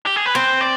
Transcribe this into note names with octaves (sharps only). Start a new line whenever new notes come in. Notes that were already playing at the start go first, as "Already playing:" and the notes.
G4
G#4
B4
C4 C5
D5